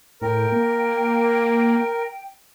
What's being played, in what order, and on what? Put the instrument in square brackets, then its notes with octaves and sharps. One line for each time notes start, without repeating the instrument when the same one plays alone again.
[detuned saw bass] A2 [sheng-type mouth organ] A#4 [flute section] G5
[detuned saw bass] A#3